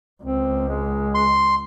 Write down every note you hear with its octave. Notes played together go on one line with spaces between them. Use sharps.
C#2 C4
G#3
C6